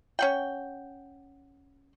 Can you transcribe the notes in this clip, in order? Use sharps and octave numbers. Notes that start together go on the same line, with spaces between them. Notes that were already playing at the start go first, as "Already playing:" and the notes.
C#4 F#5 G5